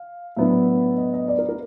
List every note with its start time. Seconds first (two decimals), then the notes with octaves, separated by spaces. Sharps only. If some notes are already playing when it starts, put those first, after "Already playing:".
Already playing: F5
0.36 A2 F#3 B3 D4 E5
0.98 D#5
1.13 D#5
1.28 D5
1.38 A#4
1.49 A#4